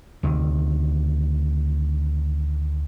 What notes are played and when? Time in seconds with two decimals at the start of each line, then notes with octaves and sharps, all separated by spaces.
0.23 D2 C3 D#3